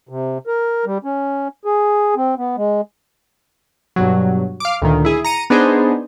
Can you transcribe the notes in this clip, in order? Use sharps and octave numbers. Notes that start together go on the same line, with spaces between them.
C3
A#4
G3
C#4
G#4
C4
B3
G#3
G2 B2 F#3
F5 D6
D2 A#2 D#3
E4 G#4
A#5 C#7 D#7
B3 D4 D#4 G#4 C5